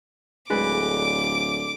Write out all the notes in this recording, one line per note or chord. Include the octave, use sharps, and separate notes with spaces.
D1 D3 G#3 B4 D6